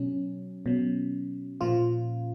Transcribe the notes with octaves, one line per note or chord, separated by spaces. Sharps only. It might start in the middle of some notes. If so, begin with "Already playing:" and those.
Already playing: B2 F#3 C#4
B2 F#3
A#2 F3 F4